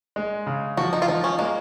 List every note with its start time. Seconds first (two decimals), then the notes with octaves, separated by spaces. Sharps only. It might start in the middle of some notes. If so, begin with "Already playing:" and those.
0.16 G#3
0.46 C#3
0.77 F3 F#4
0.93 D#4
1.02 F4
1.08 F3 D#4
1.24 C#4
1.39 G#3 A#3